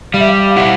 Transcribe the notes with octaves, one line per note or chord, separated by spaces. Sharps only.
G3 F5
E5
F5
F5
E4 F#5